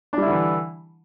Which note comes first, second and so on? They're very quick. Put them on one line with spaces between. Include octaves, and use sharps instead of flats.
D4 G3 E4 D3 E3